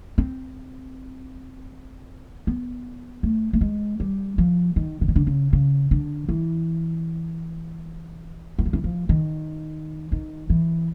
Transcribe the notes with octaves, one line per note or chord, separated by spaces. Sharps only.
C4
B3
A3
A3
G#3
G3
F3
D#3
D3
D#3
D3
C#3
C#3
D3
E3
E3
F3
E3
F3
D#3
D#3
E3